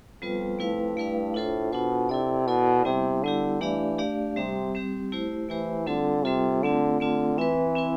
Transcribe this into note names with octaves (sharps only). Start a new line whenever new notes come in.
F2 G3 B3 F4 B4
A3 E4 B4 F5
G2 A3 E4 B4 F5
A2 D4 F4 A4 C5
B2 D4 F4 A4 C5
C3 E4 A4 D5
B2 E4 A4 D5
C3 G3 B3 E4 G4
D3 G3 B3 E4 G4
E3 A3 D4 G4 D5 F5
A3 D4 G4 D5 F5
C3 G3 C4 G4
G3 C4 G4
A3 E4 G4 C5
E3 A3 E4 G4 C5
D3 G3 C4 F4 A4
C3 G3 C4 F4 A4
D3 A3 C4 F4
D3 A3 C4 F4
E3 C4 E4 B4
C4 E4 B4